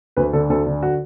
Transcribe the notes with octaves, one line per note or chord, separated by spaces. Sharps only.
D2 B4
D3 A4
D2 A4
D3
F#4